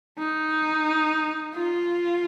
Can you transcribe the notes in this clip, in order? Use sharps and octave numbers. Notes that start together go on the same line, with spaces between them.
D#4
F4